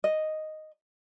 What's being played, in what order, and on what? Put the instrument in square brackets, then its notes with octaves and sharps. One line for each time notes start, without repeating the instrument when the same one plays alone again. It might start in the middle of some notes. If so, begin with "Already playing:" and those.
[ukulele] D#5